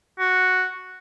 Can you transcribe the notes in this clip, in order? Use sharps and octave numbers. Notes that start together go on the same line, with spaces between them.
F#4